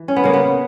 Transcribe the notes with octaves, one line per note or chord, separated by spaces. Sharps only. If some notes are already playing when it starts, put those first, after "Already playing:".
Already playing: E3
C#4
B3
C#3 A#3
B3